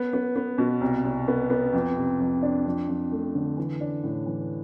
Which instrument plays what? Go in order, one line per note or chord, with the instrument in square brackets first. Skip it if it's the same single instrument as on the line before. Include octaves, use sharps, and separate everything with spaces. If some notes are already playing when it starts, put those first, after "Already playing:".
Already playing: [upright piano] B3
B3
B3
B2
C2
C2
B3
B3
F2
C3
F2
D4
F2
F2
A3
D3
E3
D4
A2
E3